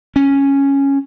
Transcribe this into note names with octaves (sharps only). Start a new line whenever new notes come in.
C#4